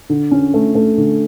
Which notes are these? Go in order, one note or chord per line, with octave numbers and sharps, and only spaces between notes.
D3
C#4
A3
A3
D3